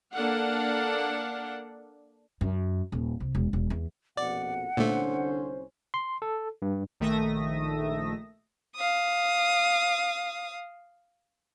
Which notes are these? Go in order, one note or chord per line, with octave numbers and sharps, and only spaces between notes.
A#3 D4 A4 F5 F#5
F#2
D#1
C2
E1
E1
E2
A#1 F2 B2 D5 F#5
C2 A#2 D3 A3 C#4 C5
C6
A4
G2
A#1 D#3 A3 E5 D#6 A#6
F5 D#6